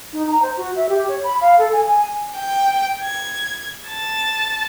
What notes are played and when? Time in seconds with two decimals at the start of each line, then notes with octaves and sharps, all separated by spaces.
0.13 D#4
0.27 A#5
0.42 C5
0.57 F#4
0.76 E5
0.89 G4
1.08 C#5
1.24 B5
1.41 F5
1.58 A4
1.73 G#5
1.86 G#5
2.36 G5
3.01 G#6
3.88 A5